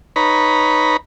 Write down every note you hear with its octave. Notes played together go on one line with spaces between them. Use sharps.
D#4 B4 C#5 A#5 B5